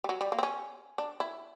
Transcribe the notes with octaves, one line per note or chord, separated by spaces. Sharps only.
G3
F#3
G3
A#3
C4
C#4
D4
E4